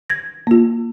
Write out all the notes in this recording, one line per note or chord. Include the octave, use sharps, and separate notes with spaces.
G#6 A#6
A#3 F4